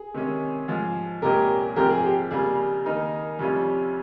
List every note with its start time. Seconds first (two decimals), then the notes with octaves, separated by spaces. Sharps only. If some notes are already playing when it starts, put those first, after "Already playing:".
Already playing: G#4
0.14 C3 D#3 G#3 C#4
0.68 G#2 F3 G#3
1.22 C2 A#2 G#3 C#4 G4 A#4
1.76 G#2 F3 C4 G4 A#4
1.90 G#4
2.04 G4
2.31 F2 C#3 G3 A#3 F4 G#4
2.85 D#3 A#3 D#4 A#4
3.39 F2 C3 G3 C#4 F4